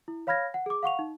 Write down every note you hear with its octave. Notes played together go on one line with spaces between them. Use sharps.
E4
C#5 F5 B5 F6 G#6 A#6
F#5
G#4 D6
F5 F#5 C#6 F7
D#4